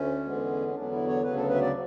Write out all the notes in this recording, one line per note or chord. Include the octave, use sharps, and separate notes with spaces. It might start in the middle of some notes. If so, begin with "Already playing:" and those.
Already playing: D2 A3 C#4
E2 D3 G#3 B3
C#4
E2 D3 F#3 B3 D4
E4
C#5
D2 C#3 F#3 B3 B4
A4
B4
E5
D5